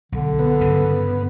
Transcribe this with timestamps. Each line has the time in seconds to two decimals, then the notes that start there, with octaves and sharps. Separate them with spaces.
0.12 B1 D3
0.39 B3
0.61 G2 C#3